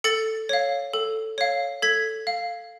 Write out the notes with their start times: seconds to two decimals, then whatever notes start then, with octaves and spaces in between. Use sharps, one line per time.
0.04 A4 A6 C#7
0.49 C#5 F5
0.94 A4
1.38 C#5 F5
1.82 A4 G#6 B6
2.27 F5